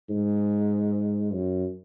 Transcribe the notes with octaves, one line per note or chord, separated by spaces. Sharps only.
G#2
F#2